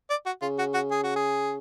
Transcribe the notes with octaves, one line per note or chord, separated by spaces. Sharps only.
D5
F#4
C#3 F4
F#4
F#4
G#4
F#4
G#4